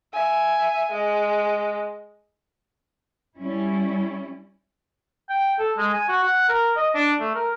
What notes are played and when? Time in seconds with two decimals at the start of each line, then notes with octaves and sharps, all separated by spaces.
0.14 E5 G#5
0.92 G#3
3.39 G3 C#4 E4
5.30 G5
5.59 A4
5.78 G#3
5.94 G#5
6.09 F#4
6.24 F#5
6.49 A#4
6.77 D#5
6.95 D4
7.20 A3
7.35 A#4